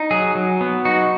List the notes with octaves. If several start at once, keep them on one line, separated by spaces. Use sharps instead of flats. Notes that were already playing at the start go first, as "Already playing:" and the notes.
Already playing: D#4
F#3 G#4
F#3
B3
D#4 F#4